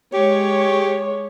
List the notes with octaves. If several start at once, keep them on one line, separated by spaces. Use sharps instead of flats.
G#3 G4 C#5